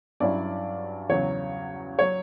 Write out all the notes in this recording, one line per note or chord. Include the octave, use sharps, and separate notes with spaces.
G2 F#3 C#4 E4 D5
E2 C#3 F#3 C#5
F#3 C#5